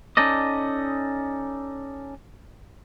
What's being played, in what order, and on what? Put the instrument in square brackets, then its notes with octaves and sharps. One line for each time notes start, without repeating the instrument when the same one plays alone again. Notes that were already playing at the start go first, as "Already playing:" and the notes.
[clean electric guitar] C#4 D#4 A4 D5 D#5